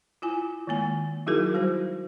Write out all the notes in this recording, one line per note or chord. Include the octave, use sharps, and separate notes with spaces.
E4 F4 G#5
D#3 G#3 A#3 G#5
F#3 D#4 E4 F#4 G#4 A#4
G3 F#4 C5